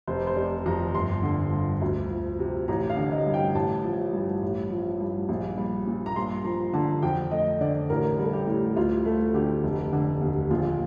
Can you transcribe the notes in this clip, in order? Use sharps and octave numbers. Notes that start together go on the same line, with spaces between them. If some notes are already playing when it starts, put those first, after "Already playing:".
F1 C5
C5
C3 D5
F2 A#5
G1 C6
D3
G2
D2
F3
C3
A1 A#5
F5
D3
D#5
G2
G5
A1 A5
F3
G2
A1
F3
G2
A#1
G3
A#2
A#5
G2 C6
F3 A#5
D3 A5
F2 G5
A3 D#5
D3 D5
A1 A#4
G3
A4
G4
A2
D2 F4
A3 A4
D3 G4
F1
D3
D#2
A#1 F4